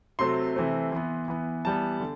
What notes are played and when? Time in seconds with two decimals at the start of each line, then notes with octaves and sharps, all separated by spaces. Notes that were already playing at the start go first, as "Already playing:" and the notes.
0.19 C3 F#3 A3 C4 C6
0.56 C3 E3 A3 C4
0.92 E3 B3
1.28 E3 B3
1.65 E3 G3 B3 A5
2.00 D3